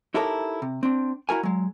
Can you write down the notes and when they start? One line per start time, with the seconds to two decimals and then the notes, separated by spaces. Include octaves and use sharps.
0.14 D#4 E4 G4 A4 A#4 C#5
0.62 C3
0.83 C4 D4
1.29 E4 F#4 A#4 G#5
1.43 F#3 G#3